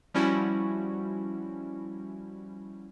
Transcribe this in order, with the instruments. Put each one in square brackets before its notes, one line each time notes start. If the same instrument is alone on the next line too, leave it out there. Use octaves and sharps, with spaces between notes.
[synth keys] F3 G3 C#4 E4 F#4